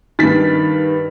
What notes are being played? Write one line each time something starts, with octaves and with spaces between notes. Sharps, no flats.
G2 D#3 A6 B6